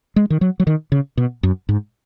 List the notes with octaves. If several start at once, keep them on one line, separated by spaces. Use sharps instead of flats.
G#3
D#3
F#3
F#3
D#3
C#3
B2
F#2
G#2